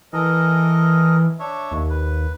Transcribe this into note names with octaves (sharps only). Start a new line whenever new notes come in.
E3 A4 A#4 D#5
D4 C#5 E5
D#2
B4